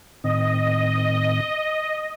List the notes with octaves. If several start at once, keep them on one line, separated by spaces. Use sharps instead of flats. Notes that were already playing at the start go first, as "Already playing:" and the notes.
A2 D#3 C4 D#5